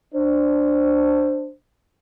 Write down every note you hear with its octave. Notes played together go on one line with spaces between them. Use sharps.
D4 C5